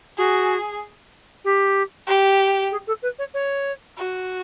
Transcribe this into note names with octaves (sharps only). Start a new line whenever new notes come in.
F#4 G#4
G4
G4
G#4
A4
B4
C#5
C#5
F#4